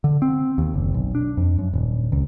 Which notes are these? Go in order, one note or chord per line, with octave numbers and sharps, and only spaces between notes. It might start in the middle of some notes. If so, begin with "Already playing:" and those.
D3
C4
D#2
F#1
B1
D4
F2
F#2
D#1
C#2